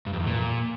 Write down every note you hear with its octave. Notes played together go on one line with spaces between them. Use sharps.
G2
F2
E2
A#2